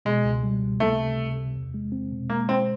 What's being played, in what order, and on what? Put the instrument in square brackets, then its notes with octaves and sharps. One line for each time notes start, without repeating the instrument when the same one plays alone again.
[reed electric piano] B2 [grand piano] G#3
[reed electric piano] C#2
G3
C#2
[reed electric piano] C3 [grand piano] A3
[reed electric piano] C3
C3
C3
E2
G#3
C4
B2
[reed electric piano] G#3 [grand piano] A#3
[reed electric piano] G#3 [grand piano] C4